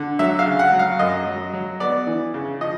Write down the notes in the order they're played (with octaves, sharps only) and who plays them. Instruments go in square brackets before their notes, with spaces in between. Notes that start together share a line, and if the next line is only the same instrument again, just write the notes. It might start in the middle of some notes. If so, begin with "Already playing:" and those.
Already playing: [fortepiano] D3
F#3 E5
F5
C#3
F#5
F#3
F5
F#2 D#5
F#3
F#3
B3 D5
E3
C#3
F3 D#5